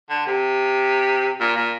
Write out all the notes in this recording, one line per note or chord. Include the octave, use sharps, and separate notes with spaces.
D3
C3
A#2
A#2